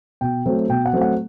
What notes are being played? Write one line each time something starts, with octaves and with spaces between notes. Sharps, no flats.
B2 G5
F#3 A3 C4
B2 G5
F#5
F#3 A3 C4
F#5